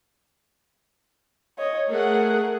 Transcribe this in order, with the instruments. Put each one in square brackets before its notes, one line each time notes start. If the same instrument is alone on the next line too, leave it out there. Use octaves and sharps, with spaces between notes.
[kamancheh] C#5 D#5
[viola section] A3 G#4 F#5 [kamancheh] A#4